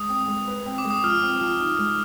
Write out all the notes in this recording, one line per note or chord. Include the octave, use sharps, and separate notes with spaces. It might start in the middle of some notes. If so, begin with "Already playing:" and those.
Already playing: G#3 D#6
C4
G#3
B4
C4
D6
G#3
D#6
F3 F6
C4
F3
D#4
G#3